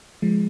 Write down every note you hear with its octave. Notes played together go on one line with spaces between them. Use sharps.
F3 G#3